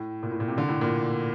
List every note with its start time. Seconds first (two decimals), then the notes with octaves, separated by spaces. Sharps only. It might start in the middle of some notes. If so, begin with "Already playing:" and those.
Already playing: A2
0.23 A#2
0.31 A2
0.40 A#2
0.48 C3
0.58 D3
0.68 A2
0.81 A#2